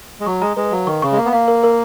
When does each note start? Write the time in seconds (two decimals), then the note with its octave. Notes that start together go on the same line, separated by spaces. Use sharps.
0.20 G#3
0.26 F#3 C#6
0.41 G#3 A#5
0.57 G#3 B4
0.72 F#3 F5
0.86 D#3 C#6
1.02 C#3 C#6
1.12 G#3
1.17 A#3 F5
1.25 B3
1.33 A#3 F5
1.48 A#4
1.63 A#4